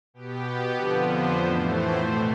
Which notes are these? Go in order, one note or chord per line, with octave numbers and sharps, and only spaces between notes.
B2 B3 G4
F2 D3 F3 B3 A4
C5
A2 E3 A3 B4
C5
B2 A3